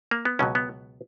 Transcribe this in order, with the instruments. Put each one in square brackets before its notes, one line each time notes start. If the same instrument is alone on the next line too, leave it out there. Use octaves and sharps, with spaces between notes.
[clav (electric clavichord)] A#3
B3
C#2 B2 F#3 C#4
B3